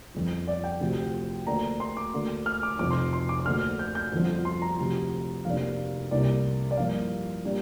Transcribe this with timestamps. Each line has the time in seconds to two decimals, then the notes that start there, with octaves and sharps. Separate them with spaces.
0.15 G1 F2 F3
0.47 D5
0.64 G5
0.80 D2 C3 F3
1.46 D2 D3 A#3 D4 A#5
1.80 C6
1.97 D6
2.13 D2 D3 A#3
2.46 F6
2.63 D6
2.79 F1 F2 F3 D6
2.91 C6
3.13 C6
3.29 D6
3.40 D6
3.46 D2 D3 A#3 D4 F6
3.79 G6
3.95 G6
4.12 G1 F2 D3 F3
4.45 C6
4.62 A#5
4.79 D2 C3 F3
5.45 F1 F2 C3 A#3 D4 F5
6.11 C2 C3 A#3 D4 D5
6.71 D5
6.77 G2 F3 A#3 F5
7.44 A#2 G3 A#3 D4